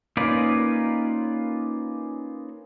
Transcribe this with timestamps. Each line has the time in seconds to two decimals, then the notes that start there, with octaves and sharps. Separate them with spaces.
0.17 A#3 C#4 D#4 F4 B4 D5